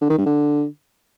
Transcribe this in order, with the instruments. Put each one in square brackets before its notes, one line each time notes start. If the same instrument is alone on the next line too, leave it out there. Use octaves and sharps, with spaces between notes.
[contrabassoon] D3
D#3
G2
D3